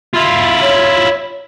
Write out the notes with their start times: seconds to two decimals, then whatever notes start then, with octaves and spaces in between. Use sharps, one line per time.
0.14 E4 F4
0.62 C#5